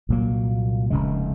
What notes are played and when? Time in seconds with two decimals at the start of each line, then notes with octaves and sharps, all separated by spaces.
0.09 C2 A#2 F#3 A#3
0.90 F1 D#2 C#3 G#3